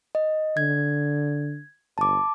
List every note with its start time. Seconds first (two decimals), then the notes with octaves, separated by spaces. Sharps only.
0.15 D#5
0.57 D3 G#6
1.98 G1 A5 D6